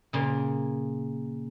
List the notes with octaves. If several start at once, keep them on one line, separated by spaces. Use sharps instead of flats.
A#2 C#3